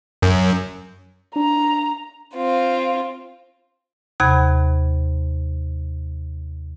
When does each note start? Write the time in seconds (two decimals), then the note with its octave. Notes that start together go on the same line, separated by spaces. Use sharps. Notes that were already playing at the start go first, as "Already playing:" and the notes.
0.22 F#2
1.36 D4 A#5
2.35 C4 F4
4.20 D#2 C3 B5 G#6